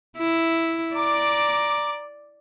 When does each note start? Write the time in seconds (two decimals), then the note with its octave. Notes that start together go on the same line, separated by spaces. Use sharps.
0.18 E4
0.96 D5 A#5 D6